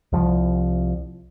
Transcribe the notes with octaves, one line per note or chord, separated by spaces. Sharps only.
C2 F3